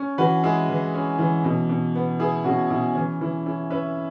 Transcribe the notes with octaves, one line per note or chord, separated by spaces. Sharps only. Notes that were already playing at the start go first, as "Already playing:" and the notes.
Already playing: C#4
E3 F#4 B4
G#3 E4 G#4
E3
C#4
E3
B2
B2
B3
B3 E4 G#4
B2 C#4 F#4
B2 E4
E3 C#4
E3 E4
C#4 E4
C#4 B4 E5